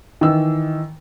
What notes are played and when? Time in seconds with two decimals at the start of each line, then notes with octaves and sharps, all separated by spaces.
0.21 D#3 E3 E6